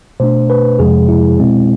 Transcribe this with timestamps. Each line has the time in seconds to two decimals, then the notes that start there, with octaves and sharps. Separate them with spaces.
0.20 B2 A3 D4 C5
0.50 B4
0.79 F2 C3 F3 G#3 G#4
1.08 E4
1.39 B2 G#3 C4